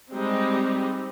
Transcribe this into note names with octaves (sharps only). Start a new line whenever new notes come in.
G3 G#3 C4 D#4 G4